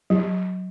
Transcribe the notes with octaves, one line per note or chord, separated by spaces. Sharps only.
F#3